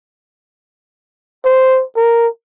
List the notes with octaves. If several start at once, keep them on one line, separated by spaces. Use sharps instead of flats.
C5
A#4